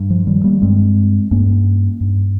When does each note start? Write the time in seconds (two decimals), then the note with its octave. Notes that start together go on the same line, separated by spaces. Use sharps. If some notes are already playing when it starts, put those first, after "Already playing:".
Already playing: G2
0.10 F3
0.27 D#3 G3
0.44 G3 A#3
0.62 G2 G#3 C4
1.31 G2 A#3 C#4
2.01 G2